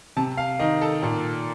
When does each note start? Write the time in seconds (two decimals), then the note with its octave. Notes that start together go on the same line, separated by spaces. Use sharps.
0.17 C3 A5
0.38 F5
0.59 D#3 D#5
0.81 A4
1.03 A#2